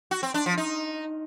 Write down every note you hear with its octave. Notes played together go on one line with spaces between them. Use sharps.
F#4
C4
D4
F3
D#4